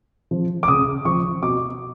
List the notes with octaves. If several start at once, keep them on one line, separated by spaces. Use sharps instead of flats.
F3
D6
C#3 D#6
F3 C#6
B2 D6